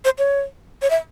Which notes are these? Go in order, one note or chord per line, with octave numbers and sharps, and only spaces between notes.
C5
C#5
C#5
E5